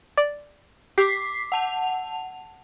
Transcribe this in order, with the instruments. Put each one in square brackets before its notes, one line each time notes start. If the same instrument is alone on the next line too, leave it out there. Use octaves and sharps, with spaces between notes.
[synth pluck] D5
[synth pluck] G4 [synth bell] D6 B6 C7
[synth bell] F#5 A5 F7